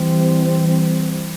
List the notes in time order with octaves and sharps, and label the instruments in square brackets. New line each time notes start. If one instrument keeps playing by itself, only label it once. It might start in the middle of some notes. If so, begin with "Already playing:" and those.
Already playing: [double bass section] E3 G3 C4